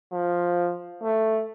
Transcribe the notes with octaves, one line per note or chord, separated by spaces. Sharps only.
F3
A3